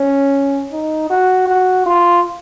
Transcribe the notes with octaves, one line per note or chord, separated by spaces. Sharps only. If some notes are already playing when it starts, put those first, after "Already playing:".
Already playing: C#4
D#4
F#4
F#4
F4